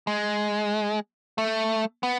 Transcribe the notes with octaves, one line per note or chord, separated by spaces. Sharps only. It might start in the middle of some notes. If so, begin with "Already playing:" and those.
G#3
A3
B3